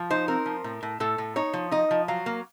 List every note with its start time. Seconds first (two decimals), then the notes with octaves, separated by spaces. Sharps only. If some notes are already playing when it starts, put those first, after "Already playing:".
Already playing: F3
0.10 D#4 C5
0.28 C4 A#4
0.46 F3
0.64 A2
0.83 A2
1.00 A2 A4
1.18 A2
1.36 D#4 C#5
1.53 F3
1.71 D#4 D#5
1.91 F3
2.08 F#3 F5
2.26 A#3